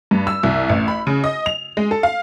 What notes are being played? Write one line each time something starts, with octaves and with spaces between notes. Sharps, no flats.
G2
E6
C2
A1
B5
C#3
D#5
F7
G#3
A4
F5